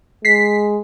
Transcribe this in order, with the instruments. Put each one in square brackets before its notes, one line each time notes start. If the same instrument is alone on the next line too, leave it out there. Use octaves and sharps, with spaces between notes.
[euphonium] G#3 [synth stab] B6 C7